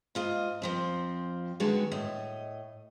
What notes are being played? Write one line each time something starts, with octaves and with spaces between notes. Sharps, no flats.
G#2 F4 D#5
F2 F3 C4
D3 D#3 G#3 B3 F#4 A4
A2 D#5